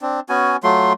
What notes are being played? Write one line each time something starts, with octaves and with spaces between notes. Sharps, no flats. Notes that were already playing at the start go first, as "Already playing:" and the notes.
C4 D4
B3 C#4 F#4 G#5
F#3 A3 F4 C6